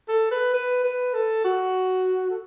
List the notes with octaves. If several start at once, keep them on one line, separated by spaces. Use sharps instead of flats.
A4
B4
B4
B4
A4
F#4
A4